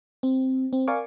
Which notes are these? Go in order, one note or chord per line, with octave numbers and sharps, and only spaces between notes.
C4
C4
A#4 D5 F5 G#5 C#6 D6